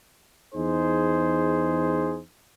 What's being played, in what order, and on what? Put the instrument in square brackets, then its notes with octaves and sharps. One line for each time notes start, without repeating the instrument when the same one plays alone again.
[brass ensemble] E2 D#4 G#4 C5